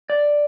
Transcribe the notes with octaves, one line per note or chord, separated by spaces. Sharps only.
D5